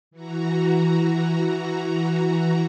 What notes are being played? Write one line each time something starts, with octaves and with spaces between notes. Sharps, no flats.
E3 F#4 A#5